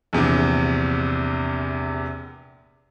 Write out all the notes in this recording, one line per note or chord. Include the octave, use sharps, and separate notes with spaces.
A#1 E2 C3